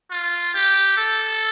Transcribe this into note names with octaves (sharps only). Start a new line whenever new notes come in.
F4
G4
A4